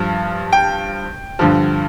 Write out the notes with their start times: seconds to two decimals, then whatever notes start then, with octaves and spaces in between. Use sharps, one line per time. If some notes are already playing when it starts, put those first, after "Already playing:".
Already playing: G2 F3
0.52 G5
1.39 G2 D3 F3